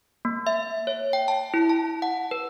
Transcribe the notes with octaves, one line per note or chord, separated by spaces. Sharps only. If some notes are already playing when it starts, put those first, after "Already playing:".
A#3
E5
C#5
G5
A5
E4
A5
F#5
B4